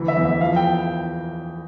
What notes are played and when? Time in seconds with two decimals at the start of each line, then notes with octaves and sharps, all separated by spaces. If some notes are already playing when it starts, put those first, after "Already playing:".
Already playing: D2 E3
0.08 E5
0.17 E2
0.25 E5
0.41 F3 F5
0.56 G5